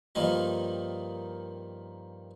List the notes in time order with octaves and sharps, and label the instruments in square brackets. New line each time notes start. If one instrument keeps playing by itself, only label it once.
[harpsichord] G2 D#3 F3 A#3 D#4